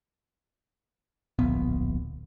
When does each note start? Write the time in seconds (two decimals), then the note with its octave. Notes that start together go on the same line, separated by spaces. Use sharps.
1.39 D1 A#1 B3